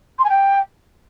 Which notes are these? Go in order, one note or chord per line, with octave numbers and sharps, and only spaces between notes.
C6
G#5
G5